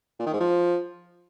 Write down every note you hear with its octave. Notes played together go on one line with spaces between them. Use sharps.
A#2
D#3
G#2
F3